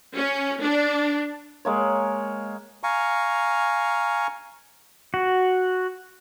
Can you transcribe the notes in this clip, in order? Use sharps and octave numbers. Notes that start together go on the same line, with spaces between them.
C#4
D4
G#3 A#3 C#5
F5 G#5 A#5 C#6
F#4